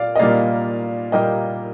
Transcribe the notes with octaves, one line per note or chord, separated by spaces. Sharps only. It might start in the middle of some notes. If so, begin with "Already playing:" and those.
Already playing: A#2 A#3 D5 F5
D#5
A#2 G3 A#3 D5 F5
A#2 G3 A#3 D#5 G5